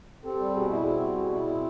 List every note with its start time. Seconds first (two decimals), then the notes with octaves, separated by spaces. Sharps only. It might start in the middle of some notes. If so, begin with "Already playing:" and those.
0.23 C4 G4 A4
0.39 G3
0.54 B2 F#4 G#4
0.70 E4
0.85 C4 F#4 G#4
1.01 G3
1.16 B2
1.32 E4
1.47 C4